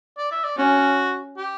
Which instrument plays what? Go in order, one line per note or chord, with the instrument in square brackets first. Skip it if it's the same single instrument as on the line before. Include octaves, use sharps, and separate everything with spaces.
[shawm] D5
E5
D5
[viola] C#4 [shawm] F#4
[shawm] G4